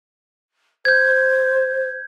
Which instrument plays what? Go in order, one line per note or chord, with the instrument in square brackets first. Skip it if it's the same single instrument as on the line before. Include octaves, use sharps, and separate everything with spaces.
[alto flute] C5 [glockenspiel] G6 G#6